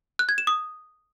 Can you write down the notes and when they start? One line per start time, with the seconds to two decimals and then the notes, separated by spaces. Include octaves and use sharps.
0.19 F#6
0.29 G#6
0.38 E7
0.47 D#6